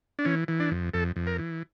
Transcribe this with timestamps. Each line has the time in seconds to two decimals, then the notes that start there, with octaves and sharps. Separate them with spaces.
0.19 D4
0.25 E3 C#4
0.48 E3
0.60 D4
0.71 F2
0.94 F2 A4
1.16 F2
1.27 A#4
1.38 E3